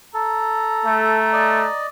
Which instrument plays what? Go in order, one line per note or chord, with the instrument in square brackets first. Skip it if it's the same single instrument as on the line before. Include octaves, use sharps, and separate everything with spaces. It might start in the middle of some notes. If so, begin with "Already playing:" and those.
[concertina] A4 [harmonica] A#5
[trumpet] A3
[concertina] D5 D#5